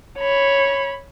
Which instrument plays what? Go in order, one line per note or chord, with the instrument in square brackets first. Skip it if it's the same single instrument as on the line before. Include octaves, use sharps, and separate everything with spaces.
[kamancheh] C#5 B5